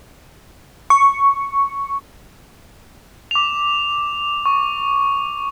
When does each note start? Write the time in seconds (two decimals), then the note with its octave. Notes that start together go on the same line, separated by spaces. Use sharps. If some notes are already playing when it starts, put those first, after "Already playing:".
0.90 C#6
3.31 D6 F7
4.46 C#6